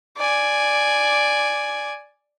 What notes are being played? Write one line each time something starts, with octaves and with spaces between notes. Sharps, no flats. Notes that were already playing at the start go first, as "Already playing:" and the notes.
D5 G#5